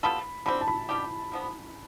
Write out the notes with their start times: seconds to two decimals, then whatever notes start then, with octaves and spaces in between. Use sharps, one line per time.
0.03 G3 B3 F4 A4 B5
0.46 D3 G3 C4 B5
0.61 A5
0.68 B5
0.89 B2 G3 D4 G4
1.32 D3 F3 B3